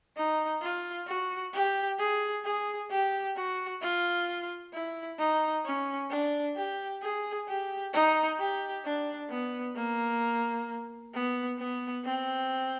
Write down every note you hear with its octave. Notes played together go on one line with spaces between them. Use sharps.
D#4
F4
F#4
G4
G#4
G#4
G4
F#4
F4
E4
D#4
C#4
D4
G4
G#4
G4
D#4
G4
D4
B3
A#3
B3
B3
C4